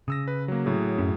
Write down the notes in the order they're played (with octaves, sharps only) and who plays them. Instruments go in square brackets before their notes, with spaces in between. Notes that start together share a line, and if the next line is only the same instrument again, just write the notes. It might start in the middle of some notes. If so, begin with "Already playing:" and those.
[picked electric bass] C#3 [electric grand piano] D#6 E6 A#6
[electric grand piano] B4
F#3 A#3
A2 F#3 G#4
[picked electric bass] F#2 C#4